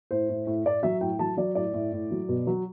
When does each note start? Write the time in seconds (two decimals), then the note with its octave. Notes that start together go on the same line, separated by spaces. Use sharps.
0.11 A2 C5
0.29 A2
0.47 A2
0.65 A2 D5
0.83 F#3 E5
1.01 A2 G5
1.19 F#3 A5
1.37 F#3 D5
1.55 A2 D5
1.74 A2
1.92 A2
2.11 F#3
2.29 B2
2.47 F#3